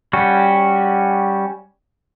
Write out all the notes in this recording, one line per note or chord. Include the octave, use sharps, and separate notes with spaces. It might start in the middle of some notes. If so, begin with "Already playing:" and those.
G3 C#4 F#4